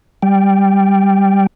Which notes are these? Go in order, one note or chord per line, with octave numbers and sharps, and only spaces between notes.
G3 G5